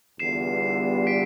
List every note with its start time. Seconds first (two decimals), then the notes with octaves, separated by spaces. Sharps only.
0.19 E2 D3 G3 B3 F4 C7 E7
1.07 B6 D7